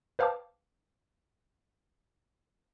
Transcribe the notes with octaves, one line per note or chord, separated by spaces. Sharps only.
B4 C5 F5 G5 A5 D6